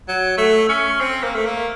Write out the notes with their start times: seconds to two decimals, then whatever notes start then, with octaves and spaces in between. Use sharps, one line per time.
0.08 F#3
0.38 A3
0.69 C#4
1.00 C4
1.23 A#3
1.35 A3
1.45 A#3